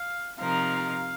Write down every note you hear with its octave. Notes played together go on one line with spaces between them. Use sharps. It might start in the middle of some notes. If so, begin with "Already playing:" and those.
Already playing: F5
C3 F3 D#4 A#4 F5